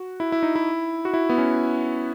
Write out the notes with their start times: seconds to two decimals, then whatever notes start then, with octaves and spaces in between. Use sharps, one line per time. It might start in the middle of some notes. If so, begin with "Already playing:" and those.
Already playing: F#4
0.20 E4
0.32 E4
0.43 D#4
0.56 E4
1.05 F#4
1.14 E4
1.29 B3
1.38 C#4